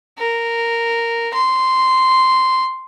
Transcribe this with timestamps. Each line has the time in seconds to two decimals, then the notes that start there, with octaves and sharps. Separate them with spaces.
0.18 A#4
1.34 C6